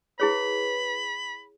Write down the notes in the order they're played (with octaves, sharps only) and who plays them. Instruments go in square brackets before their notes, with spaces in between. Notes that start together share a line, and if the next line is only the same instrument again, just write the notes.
[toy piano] E4 G#4 C#5 [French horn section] B4 [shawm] B5